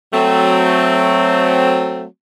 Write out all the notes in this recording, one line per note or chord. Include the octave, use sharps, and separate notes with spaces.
F#3 A3 C4